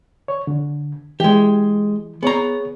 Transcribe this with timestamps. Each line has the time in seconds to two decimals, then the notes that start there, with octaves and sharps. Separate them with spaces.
0.28 C#5
0.47 D3
1.20 E3 G#3 G4
2.23 B3 G#4 C#5 A#5